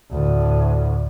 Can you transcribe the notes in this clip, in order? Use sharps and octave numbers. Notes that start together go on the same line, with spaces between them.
D2 A2